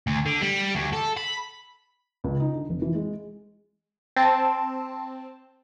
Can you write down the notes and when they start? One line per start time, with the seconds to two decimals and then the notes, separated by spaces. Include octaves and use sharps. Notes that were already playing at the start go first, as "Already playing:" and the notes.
0.07 D2
0.26 D3
0.41 G3
0.75 D2
0.93 A4
1.17 B5
2.24 C#2
2.40 D#4
2.55 D3
2.70 F1
2.82 E3
2.95 G#3
4.16 C4 A5